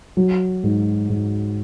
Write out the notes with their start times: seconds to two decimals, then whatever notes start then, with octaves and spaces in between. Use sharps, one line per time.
0.17 F#3
0.63 G#2
1.09 G#2